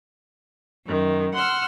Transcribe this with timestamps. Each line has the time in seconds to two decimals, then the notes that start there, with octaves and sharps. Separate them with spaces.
0.85 F#2 D#3
1.34 F#5 C6 E6 F6